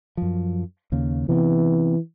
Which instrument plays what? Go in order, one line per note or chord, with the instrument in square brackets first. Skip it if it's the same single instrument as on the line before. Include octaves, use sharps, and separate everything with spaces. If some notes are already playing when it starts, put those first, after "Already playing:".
[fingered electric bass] F#2 F3
D#2 C#3 A#3
[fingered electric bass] C3 B3 C4 [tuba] E3